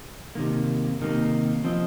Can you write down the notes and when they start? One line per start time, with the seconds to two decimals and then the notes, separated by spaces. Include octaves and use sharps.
0.35 C3 D#3 A#3
1.00 C3 D#3 A#3
1.64 F3 C4 F4 D#5